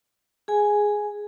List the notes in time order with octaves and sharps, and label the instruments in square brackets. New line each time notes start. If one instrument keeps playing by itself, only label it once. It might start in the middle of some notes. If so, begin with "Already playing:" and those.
[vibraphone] G#4 G#5